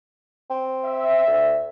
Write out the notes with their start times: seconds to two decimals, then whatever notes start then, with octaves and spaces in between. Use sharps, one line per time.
0.50 C4
0.85 E5
1.27 D2